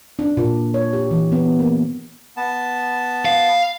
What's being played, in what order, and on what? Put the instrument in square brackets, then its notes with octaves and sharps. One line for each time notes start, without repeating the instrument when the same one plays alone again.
[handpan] D4
A#2
C#5
G4
E3
B3
A#3
[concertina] B3 A5
[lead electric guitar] F5